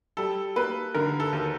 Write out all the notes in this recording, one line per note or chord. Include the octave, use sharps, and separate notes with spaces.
G3 A4
A#3 B4
D3 A#4
A4
D#2